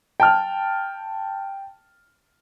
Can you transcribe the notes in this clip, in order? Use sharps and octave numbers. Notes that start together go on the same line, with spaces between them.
G5 A5 F6